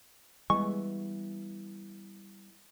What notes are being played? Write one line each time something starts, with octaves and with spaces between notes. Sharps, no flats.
E3 G3 G#3 B3 C#6